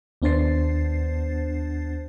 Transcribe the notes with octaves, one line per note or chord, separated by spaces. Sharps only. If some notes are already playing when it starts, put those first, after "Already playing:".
D#2 B3 D4 C5 A6 C7